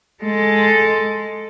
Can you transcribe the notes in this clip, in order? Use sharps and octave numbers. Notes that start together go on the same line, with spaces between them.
G#3 A4